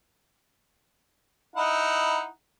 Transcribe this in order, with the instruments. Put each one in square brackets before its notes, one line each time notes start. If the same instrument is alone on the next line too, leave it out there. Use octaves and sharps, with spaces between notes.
[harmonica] D#4 E4 F#5